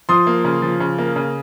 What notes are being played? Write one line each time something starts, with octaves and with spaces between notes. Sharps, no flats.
F3 C6 D#6
A#3
C#3
F3
C#3
A#3
C#3